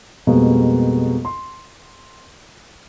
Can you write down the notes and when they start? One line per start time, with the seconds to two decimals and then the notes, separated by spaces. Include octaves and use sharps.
0.27 F2 B2 G3 G#3 A#3 B3
1.25 C6